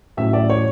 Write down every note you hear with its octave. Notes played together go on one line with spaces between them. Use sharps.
A1 A2 F#3 E5
D5
C#5